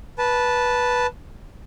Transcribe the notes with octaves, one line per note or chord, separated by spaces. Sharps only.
B4 A5